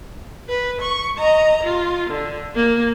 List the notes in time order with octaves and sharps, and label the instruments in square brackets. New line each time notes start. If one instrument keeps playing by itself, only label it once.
[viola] B4
C#6
D#5 A#5
F4
D3
A#3